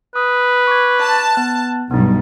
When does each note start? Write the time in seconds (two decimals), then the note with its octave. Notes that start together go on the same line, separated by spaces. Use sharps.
0.16 B4 D#6
0.67 C#6 D6 G#6
1.01 A5
1.35 B3 F#6
1.91 B1 G2 B3 D4 D#4